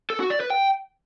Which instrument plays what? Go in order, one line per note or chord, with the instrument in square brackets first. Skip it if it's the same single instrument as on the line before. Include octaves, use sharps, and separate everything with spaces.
[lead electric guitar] A4
F#4
D5
B4
G5